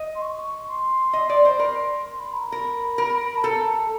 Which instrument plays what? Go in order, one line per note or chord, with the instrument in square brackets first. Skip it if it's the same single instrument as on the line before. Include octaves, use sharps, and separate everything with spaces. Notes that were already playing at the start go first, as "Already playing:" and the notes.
Already playing: [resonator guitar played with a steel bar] D#5
[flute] C6
C#6
C6
[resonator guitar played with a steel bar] D#5
D5
C5
[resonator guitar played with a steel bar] A#4 [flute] C6
[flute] C6
B5
A#5
B5
[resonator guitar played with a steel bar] A#4
[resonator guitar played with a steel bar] A#4 [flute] B5
[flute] B5
A5
[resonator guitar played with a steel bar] A4 [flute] A#5